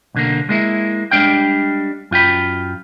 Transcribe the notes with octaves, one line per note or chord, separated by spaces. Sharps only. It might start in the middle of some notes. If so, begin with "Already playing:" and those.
B1 D3 A#3
G#3 A#3 E4
G3 G#3 D4 F5 G5
F#2 F4 G5 B5